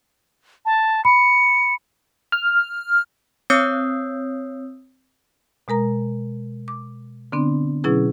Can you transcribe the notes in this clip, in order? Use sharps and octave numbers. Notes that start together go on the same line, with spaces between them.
A5
B5 C#7
F6
C4 C#5 D#6 E6 G6 C7
B2 G#3 A#4 A#5
D6
D3 B3 C4 D4
B2 F#3 C#4 E4 G#4 B4